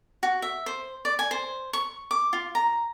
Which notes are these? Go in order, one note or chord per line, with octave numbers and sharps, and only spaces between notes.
F#4
E5
C5
D5
G#5
C5
C#6
D6
F4
A#5